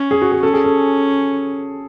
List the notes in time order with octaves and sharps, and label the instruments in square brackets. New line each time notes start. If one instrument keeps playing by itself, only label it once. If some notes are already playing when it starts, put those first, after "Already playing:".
Already playing: [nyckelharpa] C#4
[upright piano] G#4
F#4
G#4
[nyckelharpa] C#4 [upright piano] A4
[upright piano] G#4
A4